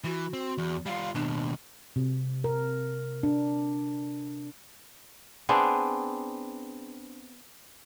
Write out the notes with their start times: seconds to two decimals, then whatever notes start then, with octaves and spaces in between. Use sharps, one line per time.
0.04 E3 F#4
0.33 C4
0.58 E2
0.86 G3 F4 F5
1.15 D#2 B2 D4
1.96 C3
2.44 A#4
3.23 D4
5.49 B3 C4 D4 G#4